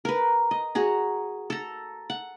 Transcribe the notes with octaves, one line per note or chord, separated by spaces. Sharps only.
A#4 B4
D#5
F#4 G#4 A#5
A4 A#5
F#5